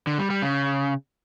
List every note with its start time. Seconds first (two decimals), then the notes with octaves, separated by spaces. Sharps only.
0.07 D3
0.19 G3
0.30 G3
0.42 C#3